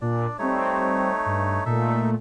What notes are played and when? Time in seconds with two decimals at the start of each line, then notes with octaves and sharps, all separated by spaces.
0.01 A#2 D4 D5
0.39 G3 A3 C4 D#4 C#5
1.26 G2
1.66 A#2 A3 D#4 A4 E5